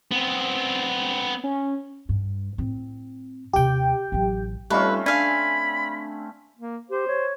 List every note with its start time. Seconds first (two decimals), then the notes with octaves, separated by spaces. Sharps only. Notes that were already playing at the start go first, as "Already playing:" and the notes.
0.12 B3 C4
1.44 C#4
2.09 G2
2.58 A2 C4
3.53 D#2 C3 G4 G5
4.12 A1 F#3
4.70 G3 A3 C4 C#4 D#4 F4 B4
5.06 D4 F5 G#5 B5
6.59 A#3
6.90 G4 C5
7.07 C#5